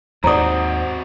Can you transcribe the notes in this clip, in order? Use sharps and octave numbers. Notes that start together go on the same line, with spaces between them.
D#2 G#2 C4 F#4 C5 D5 A#5 D#6